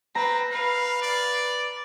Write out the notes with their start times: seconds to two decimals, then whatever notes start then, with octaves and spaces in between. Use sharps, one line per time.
0.15 C4 B4 A#5
0.52 B4 F5
1.02 D5